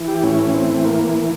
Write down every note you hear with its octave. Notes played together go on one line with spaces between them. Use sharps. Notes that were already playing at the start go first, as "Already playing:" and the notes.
Already playing: E3
G4
A2 C#4
E3 C4
A#3